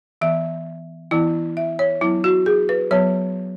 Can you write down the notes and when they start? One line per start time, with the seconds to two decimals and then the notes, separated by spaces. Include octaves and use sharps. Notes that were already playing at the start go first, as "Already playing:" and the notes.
0.21 E3 B3 E5
1.11 E3 B3 E4
1.57 E5
1.79 C#5
2.01 F#3 B3 E4
2.24 F#4
2.46 G#4
2.69 B4
2.91 F#3 B3 C#5